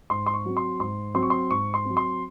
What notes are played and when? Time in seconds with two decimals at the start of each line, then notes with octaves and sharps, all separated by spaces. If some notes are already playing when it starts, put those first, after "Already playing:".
0.10 G#2 C6
0.26 C6
0.34 C#6
0.45 F#3 C4
0.57 C6
0.80 G#2 C6
1.14 F#3 C4 C6
1.23 C#6
1.30 C6
1.51 G#2 C#6
1.74 C6
1.85 F#3 C4
1.97 C6